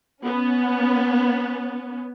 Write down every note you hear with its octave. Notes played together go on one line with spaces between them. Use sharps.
B3 C#4